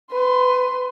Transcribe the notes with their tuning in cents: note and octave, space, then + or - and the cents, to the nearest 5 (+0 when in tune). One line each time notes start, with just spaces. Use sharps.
B4 +25 C6 +0